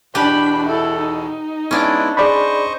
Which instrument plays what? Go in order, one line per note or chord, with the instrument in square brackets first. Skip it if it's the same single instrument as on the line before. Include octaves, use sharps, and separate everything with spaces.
[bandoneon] E2 B2 [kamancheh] D4 B5 [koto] G4 B4
[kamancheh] E4 A4
D#4
[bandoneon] G#3 B3 E4 [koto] C#4 D4
[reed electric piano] G#4 D5 B5 [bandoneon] C5 D#5 C#6